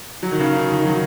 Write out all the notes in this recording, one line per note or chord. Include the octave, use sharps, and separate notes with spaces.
F#3
D#3
C#3
D#3
D#3
F#3